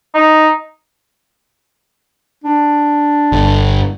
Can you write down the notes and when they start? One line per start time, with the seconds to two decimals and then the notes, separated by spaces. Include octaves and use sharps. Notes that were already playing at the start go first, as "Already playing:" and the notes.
0.14 D#4
2.44 D4
3.32 G1